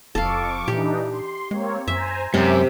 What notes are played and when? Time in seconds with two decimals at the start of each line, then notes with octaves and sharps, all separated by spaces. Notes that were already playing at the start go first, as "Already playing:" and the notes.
0.15 E1 F2 A4 F5 C#6 D6
0.68 A#2 E3 D4 D#4 G4
1.11 C6
1.51 G#3 A#3 C4 C#5
1.88 F#2 C5 E5 G#5 A#5
2.34 F#2 C3 G#3 E5 D6 B6